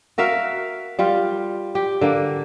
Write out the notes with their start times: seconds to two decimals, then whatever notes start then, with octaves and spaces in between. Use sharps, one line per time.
0.18 F#4 A#4 E5 F5
0.99 G3 F4
1.75 G4
2.01 D3 A#3